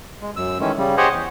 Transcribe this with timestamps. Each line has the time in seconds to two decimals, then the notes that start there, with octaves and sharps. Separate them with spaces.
0.21 G#3
0.36 F#2 E6
0.60 D#3 E3 G#3 A3 C#4
0.78 C#3 G3
0.97 G4 G#4 C5 C#5 D#5 F#5
1.11 E2